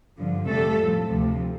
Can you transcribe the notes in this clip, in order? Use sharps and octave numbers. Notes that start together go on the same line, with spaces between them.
G2 D3 F3
F2 C3 G3 A3 A4
A2 F3
D2 C3 F3